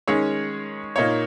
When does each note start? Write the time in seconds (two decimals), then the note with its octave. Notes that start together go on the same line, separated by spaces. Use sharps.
0.08 D#3 G#3 C#4 G#4 C#5
0.96 A#2 A#3 D#4 C#5